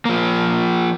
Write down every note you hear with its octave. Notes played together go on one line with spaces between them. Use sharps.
F3 A#3